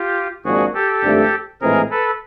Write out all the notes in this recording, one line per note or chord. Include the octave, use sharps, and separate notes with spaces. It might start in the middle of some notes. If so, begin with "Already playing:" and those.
Already playing: F4 G4
G#1 G#2 F3 A#3 D4 F#4 G#4
G4 A4
G#1 G2 D3 F3 A3
A#1 A2 E3 G#3 C4 G#4 A#4
A4 B4